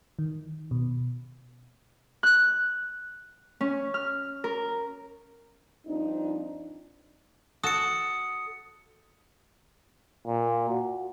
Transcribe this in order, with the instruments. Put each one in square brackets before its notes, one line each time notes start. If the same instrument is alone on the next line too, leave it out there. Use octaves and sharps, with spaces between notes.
[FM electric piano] D#3
B2
[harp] F#6
C#4
F6
A#4
[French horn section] G2 F3 C4 D4 D#4
[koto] F#4 A4 [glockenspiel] D#6 C#7
[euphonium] A#2
F#4